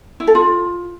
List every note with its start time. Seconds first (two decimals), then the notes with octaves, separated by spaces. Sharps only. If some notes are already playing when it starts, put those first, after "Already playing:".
0.20 E4
0.27 A4
0.35 F4